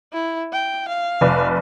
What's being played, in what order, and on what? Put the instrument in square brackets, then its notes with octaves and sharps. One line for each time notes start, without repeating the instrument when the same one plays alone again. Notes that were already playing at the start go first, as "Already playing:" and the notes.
[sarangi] E4
G5
F5
[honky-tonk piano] F1 B4 D5